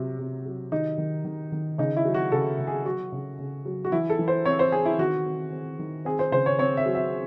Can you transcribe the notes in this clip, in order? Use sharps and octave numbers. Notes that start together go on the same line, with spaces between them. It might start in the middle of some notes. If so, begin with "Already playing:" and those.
Already playing: C3 F#3
C3
F#3
D#3 D#4
D#3
D#3
D#3
C#3 D#4
E4
F#3
F#4
C#3 A4
C#3
G#4
F#3 F#4
C#3
C#3
F#3
F#4
E3 E4
A4
E3
C5
C4 C#5
C5
C4 G#4
E4
D#3 F#4
C4
C4
D#3
C4 G#4
C5
C#3 C5
C#5
C4 C#5
E5
F#3
E5